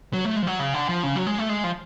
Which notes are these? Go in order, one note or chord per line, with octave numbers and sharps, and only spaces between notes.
F#3
A3
G#3
F3
F#3
C#3
D3
F3
C#3
F#3
G#3
A3
G#3
F3